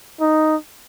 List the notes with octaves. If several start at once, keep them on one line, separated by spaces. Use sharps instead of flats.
D#4